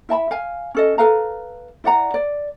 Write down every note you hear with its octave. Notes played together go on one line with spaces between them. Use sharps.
E4 E5 A5 B5
F5 G#5
C#4 A4 D#5
A4 B4 F5 A#5
E4 D5 F#5 A#5
D5